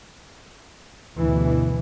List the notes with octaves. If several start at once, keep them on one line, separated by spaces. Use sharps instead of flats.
D2 G2 B2 E3